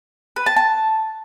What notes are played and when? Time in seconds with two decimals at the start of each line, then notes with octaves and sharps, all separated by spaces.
0.36 B4
0.46 A5
0.56 A5